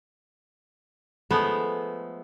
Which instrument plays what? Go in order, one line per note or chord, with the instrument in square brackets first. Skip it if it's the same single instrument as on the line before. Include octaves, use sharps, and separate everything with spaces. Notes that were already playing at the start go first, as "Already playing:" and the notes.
[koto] F3 G#3 A3 B3 A4